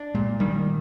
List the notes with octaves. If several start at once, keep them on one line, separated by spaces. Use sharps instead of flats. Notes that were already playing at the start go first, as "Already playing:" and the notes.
Already playing: D4
A#2 G#3
D#3 G3